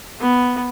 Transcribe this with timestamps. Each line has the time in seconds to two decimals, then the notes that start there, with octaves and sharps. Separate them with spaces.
0.20 B3